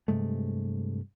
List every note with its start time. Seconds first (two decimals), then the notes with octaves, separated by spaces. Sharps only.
0.08 G2 C3 G#3 A3